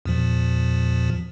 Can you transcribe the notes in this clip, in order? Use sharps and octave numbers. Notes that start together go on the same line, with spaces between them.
E2 A#2 F3